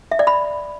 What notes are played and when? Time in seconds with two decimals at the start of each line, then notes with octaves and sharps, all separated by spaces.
0.12 E5
0.19 D5
0.27 B5